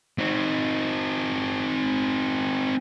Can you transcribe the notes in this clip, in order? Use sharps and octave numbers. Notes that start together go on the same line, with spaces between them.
C4 D#4